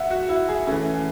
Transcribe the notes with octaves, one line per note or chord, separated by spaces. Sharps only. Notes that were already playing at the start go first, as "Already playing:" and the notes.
Already playing: E5 F#5
F#4
E4
G#4
E3 A3 C#4